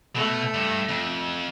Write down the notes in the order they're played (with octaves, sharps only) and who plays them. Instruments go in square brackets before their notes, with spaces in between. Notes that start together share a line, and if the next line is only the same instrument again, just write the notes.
[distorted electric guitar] B2 [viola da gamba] A3
[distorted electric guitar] G2
F2